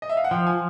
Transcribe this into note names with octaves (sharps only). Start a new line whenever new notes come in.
D#5
E5
F5
F#5
F3 G5
G#5